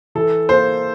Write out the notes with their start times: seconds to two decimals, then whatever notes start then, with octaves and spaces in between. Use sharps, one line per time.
0.15 E3 A4
0.49 A#3 C5